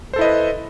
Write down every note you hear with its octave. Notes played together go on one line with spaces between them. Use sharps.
E4 A4 B4 C5 D#5